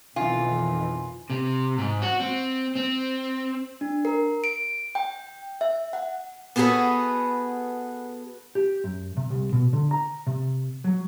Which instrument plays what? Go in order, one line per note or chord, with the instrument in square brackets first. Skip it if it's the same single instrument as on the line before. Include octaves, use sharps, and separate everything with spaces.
[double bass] B1 [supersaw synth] F2 D#3 E3 [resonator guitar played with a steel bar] F4 [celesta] G#5
[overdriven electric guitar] C3
G#2
F#4
C4
C4
[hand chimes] D4
A#4
D7
G5
E5
F#5
[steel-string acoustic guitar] B3 F#4 G#4 A4 B4
[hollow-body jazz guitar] G4
F#2
C3
C2
B2
D3
A#5
C3
F#3